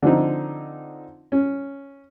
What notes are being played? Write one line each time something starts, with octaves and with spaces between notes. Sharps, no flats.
D3 F3 C4 D#4
C#4